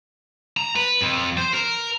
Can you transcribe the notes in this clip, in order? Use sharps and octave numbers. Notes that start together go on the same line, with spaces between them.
A#5
B4
F2
C5
A#4